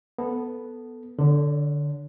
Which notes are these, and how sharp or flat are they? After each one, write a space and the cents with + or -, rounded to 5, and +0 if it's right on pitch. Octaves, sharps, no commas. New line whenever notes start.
B3 +0 A4 +0
D3 +0 C#5 +35